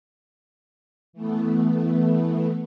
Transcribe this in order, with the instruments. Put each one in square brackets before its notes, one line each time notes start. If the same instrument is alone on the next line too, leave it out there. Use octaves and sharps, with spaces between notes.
[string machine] E3 A3 B3